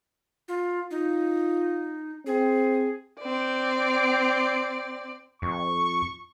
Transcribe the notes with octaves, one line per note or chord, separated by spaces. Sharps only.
F4
D#4 F4
C4 G#4
C4 D5
F2 C#6